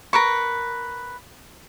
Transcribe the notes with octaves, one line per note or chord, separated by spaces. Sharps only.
A#4 B4 C#6